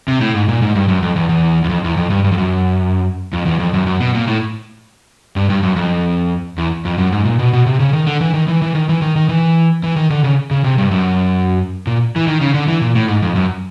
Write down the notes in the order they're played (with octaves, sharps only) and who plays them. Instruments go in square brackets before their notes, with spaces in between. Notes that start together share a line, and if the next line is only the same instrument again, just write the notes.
[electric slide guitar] C3
A2
G#2
A#2
G#2
G2
F#2
F2
E2
E2
E2
F2
E2
F2
G2
G2
F2
F#2
F2
E2
F2
F#2
F#2
B2
A#2
A2
G2
G2
F#2
F2
E2
F2
F#2
G#2
A#2
B2
B2
C3
C#3
D#3
D3
E3
D#3
E3
E3
D#3
E3
D#3
D#3
E3
E3
D#3
D3
C#3
C#3
C3
G2
F#2
A#2
E3
D#3
C#3
D3
E3
A#2
A2
G#2
F2
F#2